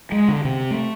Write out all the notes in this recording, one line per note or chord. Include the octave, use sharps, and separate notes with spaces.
G#3
D3
C3
A3